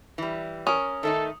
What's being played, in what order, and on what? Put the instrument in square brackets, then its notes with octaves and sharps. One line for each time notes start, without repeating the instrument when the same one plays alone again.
[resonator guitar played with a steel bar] E3 G3
[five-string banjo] C#4 A#4 [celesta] D#6
[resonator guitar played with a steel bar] D#3 A3 D#4 [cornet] A4